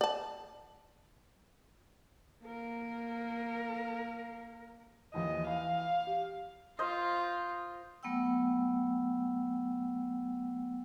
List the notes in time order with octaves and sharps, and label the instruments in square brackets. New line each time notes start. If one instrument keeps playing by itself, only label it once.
[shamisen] D5 A5
[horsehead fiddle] A#3 A#4
[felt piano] D#2 E3 F3 [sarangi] D#5
[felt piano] E3 [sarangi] F5
[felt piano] G4
[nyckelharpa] F4 [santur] C5 D#5
[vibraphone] F#3 A3 B3 F#5 G5 E6